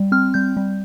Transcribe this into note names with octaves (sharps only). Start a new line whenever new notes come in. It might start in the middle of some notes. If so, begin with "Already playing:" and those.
Already playing: G3
C4 F6
G3 G6
G3